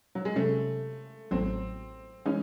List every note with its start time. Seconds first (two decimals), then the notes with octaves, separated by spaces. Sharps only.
0.15 F#3
0.25 G#3
0.36 C3 F#3 A3 C#4
1.31 A1 A2 F#3 C4
2.26 C#3 E3 G#3 C#4 D#4